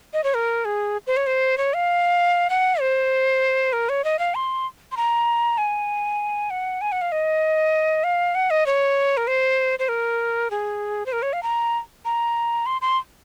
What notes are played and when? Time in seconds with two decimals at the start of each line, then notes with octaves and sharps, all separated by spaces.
0.13 D#5
0.24 C#5
0.34 A#4
0.65 G#4
1.07 C5
1.17 C#5
1.27 C5
1.58 C#5
1.74 F5
2.50 F#5
2.81 C5
3.73 A#4
3.89 C#5
4.04 D#5
4.19 F5
4.35 C6
4.92 C6
4.97 A#5
5.58 G#5
6.50 F#5
6.81 G#5
6.92 F#5
7.01 F5
7.12 D#5
8.04 F5
8.35 F#5
8.50 D#5
8.66 C#5
9.17 A#4
9.27 C5
9.79 C5
9.89 A#4
10.51 G#4
11.06 C5
11.12 A#4
11.22 C#5
11.33 F5
11.43 A#5
12.05 A#5
12.66 C6
12.82 C6